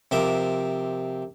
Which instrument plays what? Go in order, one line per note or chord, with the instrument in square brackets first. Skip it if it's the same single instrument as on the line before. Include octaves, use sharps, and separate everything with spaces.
[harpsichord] C3 F3 A#4 E5 D6